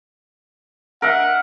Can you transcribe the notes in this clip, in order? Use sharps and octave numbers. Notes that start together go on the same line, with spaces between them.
A#4 D#5 E5 F#5